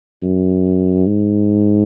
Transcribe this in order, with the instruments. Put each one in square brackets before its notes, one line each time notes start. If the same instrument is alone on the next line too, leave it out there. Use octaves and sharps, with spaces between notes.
[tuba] F#2
G#2